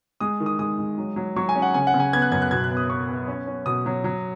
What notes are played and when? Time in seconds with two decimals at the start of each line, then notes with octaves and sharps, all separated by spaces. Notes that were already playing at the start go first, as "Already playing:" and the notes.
0.20 G#3 D#6
0.40 D#3
0.46 D#6
0.59 G#3 D#6
0.79 G#3
0.98 F#3
1.16 F#3
1.36 F#3 C#6
1.49 G#5
1.56 C#4
1.62 F#5
1.74 C#3 G#5
1.87 F#5
1.94 C#3
2.00 G#5
2.13 B3 G#6
2.22 F#6
2.32 F#2 G#6
2.42 F#6
2.51 B2 G#6
2.64 F#6
2.71 B3
2.77 D#6
2.90 B3 C#6
3.08 B3
3.28 C#4
3.47 C#4
3.66 B2 D#6
3.86 F#3
4.04 F#3